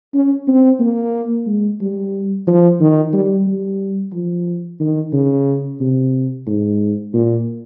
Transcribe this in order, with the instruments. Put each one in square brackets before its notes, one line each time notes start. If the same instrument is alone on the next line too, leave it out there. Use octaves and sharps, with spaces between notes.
[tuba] C#4
C4
A#3
G#3
G3
F3
D#3
G3
G3
F3
D#3
C#3
C3
G#2
A#2